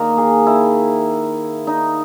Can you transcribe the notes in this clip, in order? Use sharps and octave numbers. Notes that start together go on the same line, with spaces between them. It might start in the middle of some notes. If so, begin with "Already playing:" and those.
Already playing: D#3 A#3 D#4 A#4
G#4
E4
D#4